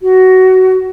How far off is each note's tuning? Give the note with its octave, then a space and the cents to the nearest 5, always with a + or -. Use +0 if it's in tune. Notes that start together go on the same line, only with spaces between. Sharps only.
F#4 +15